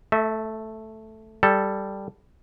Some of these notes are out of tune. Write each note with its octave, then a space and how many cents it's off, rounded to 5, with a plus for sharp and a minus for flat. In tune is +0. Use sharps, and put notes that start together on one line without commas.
A3 +0 E5 -35
G3 +0 A4 +0